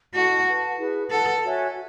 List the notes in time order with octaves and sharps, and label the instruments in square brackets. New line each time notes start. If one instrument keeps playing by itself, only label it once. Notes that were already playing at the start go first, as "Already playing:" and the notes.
[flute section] E4 A4 D#5 A5 [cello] F#4
[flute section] B4 F#5 A5
E4 G#4 B4
[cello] A4 [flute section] B4 F#5 A5
[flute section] F#4 C#5 E5 G#5